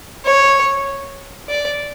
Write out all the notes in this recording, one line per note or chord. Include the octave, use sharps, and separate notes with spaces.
C#5
D5